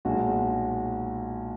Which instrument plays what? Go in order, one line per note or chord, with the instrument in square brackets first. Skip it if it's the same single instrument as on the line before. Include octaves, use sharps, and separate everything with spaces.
[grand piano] B1 A#2 G#3 F#4